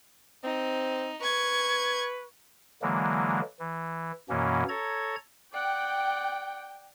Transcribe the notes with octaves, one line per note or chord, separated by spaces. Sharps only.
C4 D#4
B4 C#6 G#6
D3 E3 F#3 G#3 A#3
E3
F#2 B2 E3 A#3 C#4
A4 C#5 A#5 G#6
D5 F#5 G5